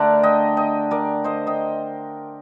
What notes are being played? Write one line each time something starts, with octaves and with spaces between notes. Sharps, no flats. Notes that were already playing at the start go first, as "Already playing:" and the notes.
Already playing: D3 A3 D4 A#4 D5
D#5 G5
D#5 G5
A#4 D5
C5 D#5
D#5 G5